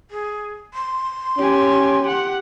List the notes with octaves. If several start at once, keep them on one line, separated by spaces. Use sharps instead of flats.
G#4
C6
C#4 G4 G#5
G4 F#5